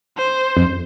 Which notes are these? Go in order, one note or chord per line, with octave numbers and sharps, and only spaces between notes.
C5
F2